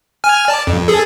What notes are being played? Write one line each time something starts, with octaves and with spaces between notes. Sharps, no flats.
G#5 F6
D5 A5
F2
G#4 A4